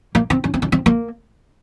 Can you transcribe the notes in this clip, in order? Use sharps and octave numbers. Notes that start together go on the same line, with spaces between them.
A#3
C4
C#4
C4
C#4
C4
A#3